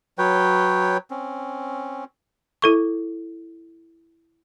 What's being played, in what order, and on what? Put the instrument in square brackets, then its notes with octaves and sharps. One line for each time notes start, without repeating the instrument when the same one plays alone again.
[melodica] F#3 B4 C#5 G5
C4 C#4
[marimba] E4 A4 C#6